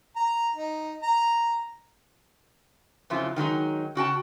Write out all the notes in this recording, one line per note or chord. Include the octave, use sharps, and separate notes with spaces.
A#5
D#4
A#5
F2 C#3 F3 F#3 E4 F4
D#3 F#3 G#3 D#4
C#3 F#4 G5 A5